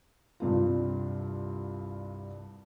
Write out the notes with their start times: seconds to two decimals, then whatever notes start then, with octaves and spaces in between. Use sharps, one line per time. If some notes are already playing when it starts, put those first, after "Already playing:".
0.40 C2 G2 F4